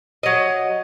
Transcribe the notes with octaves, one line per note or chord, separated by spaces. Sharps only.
F#3 D#5